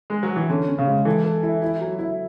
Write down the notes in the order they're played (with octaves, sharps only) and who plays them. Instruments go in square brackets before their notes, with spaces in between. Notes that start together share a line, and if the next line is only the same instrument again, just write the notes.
[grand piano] G#3
F#3
E3
[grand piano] D3 [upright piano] C#4
[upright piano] C#4
[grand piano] C#3
[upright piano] G#3
[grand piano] E3 [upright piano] A4
[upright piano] A4
E4
E4
F#3
E4